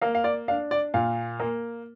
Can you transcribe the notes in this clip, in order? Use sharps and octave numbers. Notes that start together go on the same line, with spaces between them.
A#3 F5
F5
D5
D4 F5
D5
A#2 F5
A#3